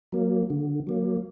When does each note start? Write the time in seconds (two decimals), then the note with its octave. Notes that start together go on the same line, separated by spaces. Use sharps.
0.12 F#3 A#3
0.50 D3
0.87 F#3 A#3